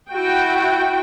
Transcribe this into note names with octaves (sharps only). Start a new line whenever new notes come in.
E4 F#4 G5